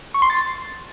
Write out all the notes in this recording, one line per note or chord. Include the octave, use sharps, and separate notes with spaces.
C#6
C6
A6